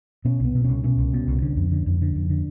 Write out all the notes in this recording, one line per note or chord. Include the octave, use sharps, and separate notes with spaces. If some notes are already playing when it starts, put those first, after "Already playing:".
B2 C#4
C2 B3
B2
C2 C#4
B2 C#4
C2
B2
C2
D3
F2
D3
F2
D3
F2
D3